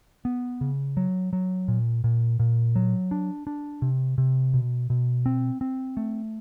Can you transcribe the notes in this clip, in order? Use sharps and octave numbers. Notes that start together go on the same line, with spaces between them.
B3
C#3
F#3
F#3
A#2
A#2
A#2
F#3
D4
D4
C3
C3
B2
B2
C4
C4
A3